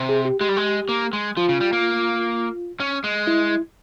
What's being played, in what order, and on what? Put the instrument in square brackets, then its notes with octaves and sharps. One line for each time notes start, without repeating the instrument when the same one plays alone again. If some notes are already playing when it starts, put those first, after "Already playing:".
Already playing: [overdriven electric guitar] C3
[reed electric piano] G#4
G4
[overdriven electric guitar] G#3 [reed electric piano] G4
[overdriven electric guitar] G3
G#3
A#3
G#3
[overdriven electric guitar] F3 [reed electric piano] F4
[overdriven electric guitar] C#3
G3
A#3
C#4
G#3
[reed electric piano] E4